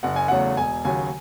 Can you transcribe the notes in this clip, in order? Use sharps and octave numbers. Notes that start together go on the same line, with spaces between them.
F#1 F#5
G#5
E2 C#3 F#3 A3 F#5
E1 G#5
D#2 C#3 F#3 G#5